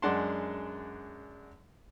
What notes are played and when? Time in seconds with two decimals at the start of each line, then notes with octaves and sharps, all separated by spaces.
0.02 F#2 G#3 D4 F#5 A5 C6